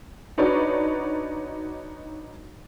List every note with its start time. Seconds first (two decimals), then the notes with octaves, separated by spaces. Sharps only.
0.38 D4 D#4 F#4 B4 C#5 D5